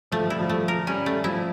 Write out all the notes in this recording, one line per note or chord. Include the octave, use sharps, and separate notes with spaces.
F3 A3
G3 E4
F3
A3
A#4
G3 C#4
A3
F3 E4